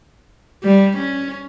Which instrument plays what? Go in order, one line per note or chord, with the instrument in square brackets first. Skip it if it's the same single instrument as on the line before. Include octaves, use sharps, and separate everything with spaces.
[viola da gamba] G3
C#4